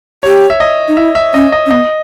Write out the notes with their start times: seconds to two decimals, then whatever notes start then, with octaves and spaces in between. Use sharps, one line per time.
0.23 G4 C#5
0.50 E5
0.60 D#5
0.88 D#4
0.97 E4 E5
1.15 E5
1.34 C#4 D#5
1.52 D#5
1.66 C#4
1.71 B3 D#5